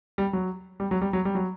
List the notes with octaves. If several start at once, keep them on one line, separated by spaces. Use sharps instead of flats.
G3
F#3
G3
F#3
G3
F#3
G3
F#3